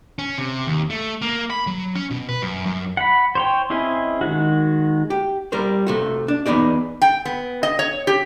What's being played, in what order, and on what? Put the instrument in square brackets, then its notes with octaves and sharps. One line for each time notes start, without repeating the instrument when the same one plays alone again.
[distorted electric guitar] C#4
C3
D#2
A3
A#3
B5
F#3
C#4
B2
B4
F#2
F#2
[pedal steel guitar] F#5 B5
C5 C#5 G5
C4 C#4 E4 G#4 D#5
D#3 G#3 F#4
[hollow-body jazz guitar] G4
G3 A#4 C5
C3 A3 F#4
D4
E2 B3 D#4 G#4 D5
[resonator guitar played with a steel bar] G5
B3
D#5
C#5
G4